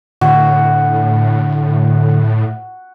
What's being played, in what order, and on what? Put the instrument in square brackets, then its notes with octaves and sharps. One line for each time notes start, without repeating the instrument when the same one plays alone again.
[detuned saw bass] A2 [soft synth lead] D3 [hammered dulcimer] F#4